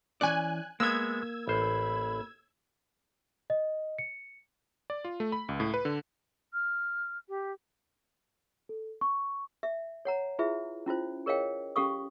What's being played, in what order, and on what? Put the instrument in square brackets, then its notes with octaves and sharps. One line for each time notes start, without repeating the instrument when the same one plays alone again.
[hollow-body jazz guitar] E3 C#4 D5 [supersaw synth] G#5 F#6
[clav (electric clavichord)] G#3 B3 [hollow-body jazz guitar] A#3 [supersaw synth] E6 G#6
[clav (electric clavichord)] A1 C5 [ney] B5
[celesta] D#5
C#7
[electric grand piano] D5
F4
A3
B5
C#2
A2
B4
D3
[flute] F6
G4
[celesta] A4
C#6
[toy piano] E5
C#5 F#5 A#5
E4 F4 G#4 B4 E5
C#4 E4 F4 C5
G#4 A#4 C#5 D#5 F5 G5
C#4 G4 A4 F5 C#6 D#6